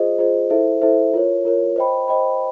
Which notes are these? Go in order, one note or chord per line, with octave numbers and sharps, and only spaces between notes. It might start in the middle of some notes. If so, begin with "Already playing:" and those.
Already playing: F4 G#4 C5 D#5
F4 G#4 C5 D#5
E4 A4 C5 E5
E4 A4 C5 E5
F4 A#4 C#5
F4 A#4 C#5
C5 D#5 G5 B5
C5 D#5 G5 B5